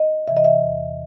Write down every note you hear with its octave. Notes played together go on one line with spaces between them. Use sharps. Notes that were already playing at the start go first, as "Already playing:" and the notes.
Already playing: D#5
C3 E3 E5
D#5
E5
E2